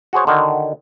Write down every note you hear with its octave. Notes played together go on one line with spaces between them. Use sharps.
F#4 G#4 C5 C#5
D3 D#3 F#4